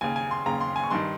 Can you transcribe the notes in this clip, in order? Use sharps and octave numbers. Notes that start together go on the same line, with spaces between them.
D#2 C#3 G#5
G#5
C6
D#2 C#3 A#5
C6
G#5
C#6
G2 D#3 C6